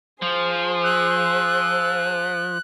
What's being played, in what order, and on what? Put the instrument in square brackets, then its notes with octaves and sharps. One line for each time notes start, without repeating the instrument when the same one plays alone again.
[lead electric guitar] F3 [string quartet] G#4 C5
[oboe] E6 [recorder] F#6